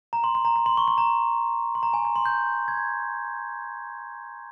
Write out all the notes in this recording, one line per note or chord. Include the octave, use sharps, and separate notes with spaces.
A#5
C6
C6
A#5
A#5
C6
C#6
C6
A#5
C6
A#5
G#5
A#5
C6
G6
G#6